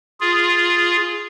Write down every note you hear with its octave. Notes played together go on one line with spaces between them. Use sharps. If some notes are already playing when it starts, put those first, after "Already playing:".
F4 G#4